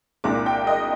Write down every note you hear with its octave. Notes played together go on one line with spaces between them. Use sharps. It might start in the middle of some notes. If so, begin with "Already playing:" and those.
C2 A#2 G#3 D4 D6
G5
D#5